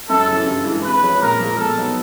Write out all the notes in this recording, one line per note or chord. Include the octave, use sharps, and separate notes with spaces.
F#2 A4
C#3 E3
G2
E3 G#3
C3 B4
F3 G#3 C#4
A#2 A#4
F3 G#3
B2 A4
F#3 B3 D#4 F#4